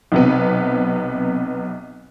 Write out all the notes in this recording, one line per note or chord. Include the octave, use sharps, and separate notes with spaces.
B1 C3 B3